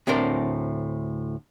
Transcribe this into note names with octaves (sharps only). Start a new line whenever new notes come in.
D2 A2 C4 D4 A#4 C5